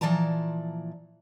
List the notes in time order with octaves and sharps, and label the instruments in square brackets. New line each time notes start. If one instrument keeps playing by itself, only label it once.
[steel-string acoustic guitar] A#2 E3 F3 D5 A5 A#5